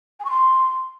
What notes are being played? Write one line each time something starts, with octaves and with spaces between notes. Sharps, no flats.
G#5
C#6
C6